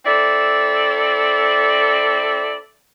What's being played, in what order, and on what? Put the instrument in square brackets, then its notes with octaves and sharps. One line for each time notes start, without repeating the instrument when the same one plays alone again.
[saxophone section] C4 E4 A4 D5